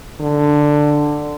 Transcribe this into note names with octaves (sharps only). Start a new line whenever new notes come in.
D3